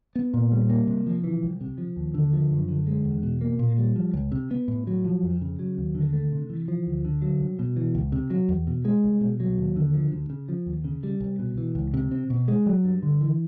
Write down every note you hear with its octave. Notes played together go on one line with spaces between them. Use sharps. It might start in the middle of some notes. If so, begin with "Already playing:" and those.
B3
A#2
G3
A#3
C3
F3
E3
C2
C3
F3
D#2
D3
F3
F#2
D3
G#3
E2
B2
A#3
A#2
G3
F3
C#2
C3
B3
A2
F#3
F3
F2
C#3
F#3
D#2
D3
A3
C3
E3
F3
D2
D3
F#3
C2
B2
E3
C#2
C3
F#3
E2
B2
G#3
C2
B2
F#3
D#2
D3
F3
D2
C#3
F3
D#2
C#3
G3
C2
B2
E3
C#2
C3
C4
B2
G#3
F#3
G2
D3
E3